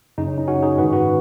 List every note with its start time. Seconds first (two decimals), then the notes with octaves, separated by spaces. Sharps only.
0.18 F#2 C#3 D#4
0.28 C#4
0.38 D#4
0.47 C#4 F#4
0.63 D#4 G#4
0.78 G#2 F#4 B4
0.82 D#3
0.93 F#4 B4